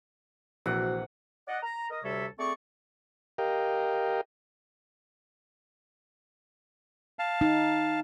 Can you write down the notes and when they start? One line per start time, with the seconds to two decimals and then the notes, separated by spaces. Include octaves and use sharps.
0.66 A#1 C3 E3 F#4 F#5
1.48 D5 D#5 F#5
1.62 A#5
1.90 A#4 D#5
2.03 D2 C3 G3 A4 C#5 E5
2.38 A3 C4 G#4 D5 C#6
3.38 G4 A#4 D#5 F5 G5
7.19 F5 A5
7.41 D#4